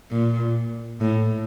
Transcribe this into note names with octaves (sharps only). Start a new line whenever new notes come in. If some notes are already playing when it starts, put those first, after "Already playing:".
A#2
A2